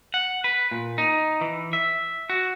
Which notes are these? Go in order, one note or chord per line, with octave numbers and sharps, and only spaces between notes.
F#5
B4
A#2
D#4
E3
E5
F#4